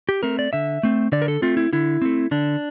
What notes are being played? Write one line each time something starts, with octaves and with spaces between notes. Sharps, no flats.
G4
A3 C4 A#4
D5
D3 E5
A3 C4
D3 D5
A#4
A4
A3 C4 F4
E4
D3 E4
A3 C4
D3 D4